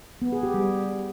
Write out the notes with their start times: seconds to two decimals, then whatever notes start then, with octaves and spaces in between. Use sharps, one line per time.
0.22 B3
0.32 G#4
0.43 G4
0.54 G3